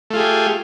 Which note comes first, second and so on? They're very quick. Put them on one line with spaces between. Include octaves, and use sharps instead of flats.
A3 F4 G#4 G4